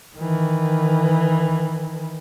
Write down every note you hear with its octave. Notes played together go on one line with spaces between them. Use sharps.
D#3 E3